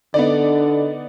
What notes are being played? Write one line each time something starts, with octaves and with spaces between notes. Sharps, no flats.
D3 B3 D#4 D5